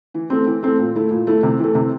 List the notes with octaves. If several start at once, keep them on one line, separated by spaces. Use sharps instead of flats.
E3
A3 C4
E3
A3 C4
A#2
A3 E4
A#2
A3 E4
C3
E3 A3
C3